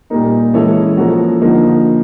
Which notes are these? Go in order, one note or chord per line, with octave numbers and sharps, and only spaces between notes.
A#2 G3 A#3 D#4
E3 G#3 C#4 E4 A4
F3 A#3 C#4 F#4 A4
D3 F3 A#3 D#4